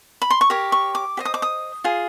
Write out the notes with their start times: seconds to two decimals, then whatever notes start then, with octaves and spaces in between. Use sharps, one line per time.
0.22 B5
0.30 C6
0.41 C#6
0.50 G4 A#4 C#5 D6
0.72 C#6
0.95 D6
1.17 G4 C5 D#5
1.25 D#6
1.34 D6
1.42 D#6
1.84 F4 G#4